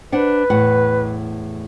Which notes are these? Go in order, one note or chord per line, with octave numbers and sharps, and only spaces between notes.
D4 B4 C5 F#5
E2 A2 F#5